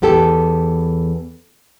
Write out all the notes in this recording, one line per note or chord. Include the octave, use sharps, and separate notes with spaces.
E2 B3 G4 A4